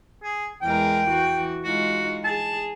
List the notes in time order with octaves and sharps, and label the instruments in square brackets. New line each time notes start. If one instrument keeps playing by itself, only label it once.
[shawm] G#4
[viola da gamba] E2 G#3 A#4 [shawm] G5
[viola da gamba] E3 F#4
[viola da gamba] G#3 D#4 F4 [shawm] F#4
[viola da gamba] G#4 [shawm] A5